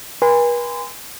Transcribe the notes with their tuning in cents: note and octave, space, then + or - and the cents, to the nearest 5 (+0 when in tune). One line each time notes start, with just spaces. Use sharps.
B4 -45 G#5 -30 C6 -30